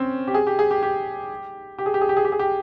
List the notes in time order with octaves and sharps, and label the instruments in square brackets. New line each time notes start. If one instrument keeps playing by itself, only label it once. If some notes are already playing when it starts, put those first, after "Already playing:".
Already playing: [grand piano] C4 C#4
G4
G#4
G4
G#4
G4
G4
G4
G#4
G4
G#4
G4
G#4
G4
G#4
G4